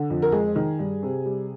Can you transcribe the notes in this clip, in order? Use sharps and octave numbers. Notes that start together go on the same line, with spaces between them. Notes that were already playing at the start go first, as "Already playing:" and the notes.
Already playing: D3
F2
A#4
G#3 G#4
D#3
G2
C3
G3